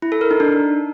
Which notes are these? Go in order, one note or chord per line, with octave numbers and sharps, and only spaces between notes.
E4
A4
A#4
D#4
D4